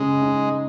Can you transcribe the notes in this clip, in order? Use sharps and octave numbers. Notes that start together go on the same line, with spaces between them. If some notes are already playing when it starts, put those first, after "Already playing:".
Already playing: C#3 G#3
D#4